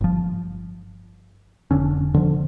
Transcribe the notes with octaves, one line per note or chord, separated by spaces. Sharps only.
G1 F3
F1 D3 C#4
D3 F3